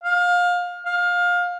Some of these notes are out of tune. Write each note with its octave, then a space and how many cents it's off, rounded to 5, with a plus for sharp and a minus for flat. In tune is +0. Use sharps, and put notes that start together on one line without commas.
F5 +25
F5 +25